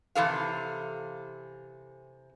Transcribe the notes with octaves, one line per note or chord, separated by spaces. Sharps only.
C3 E3 A4 F5